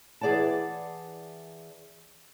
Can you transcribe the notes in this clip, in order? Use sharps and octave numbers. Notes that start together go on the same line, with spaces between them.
E3 G#4 D5 F#5 A5